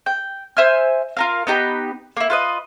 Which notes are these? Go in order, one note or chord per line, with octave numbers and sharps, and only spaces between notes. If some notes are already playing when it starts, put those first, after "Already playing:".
G5
C5 E5 G#5 F6
F4 A#4 F5
B3 D#4 G4 B5
A#3 E4
F4 B4 D#5